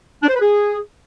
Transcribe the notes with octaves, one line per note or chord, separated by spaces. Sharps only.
D4
C5
B4
G#4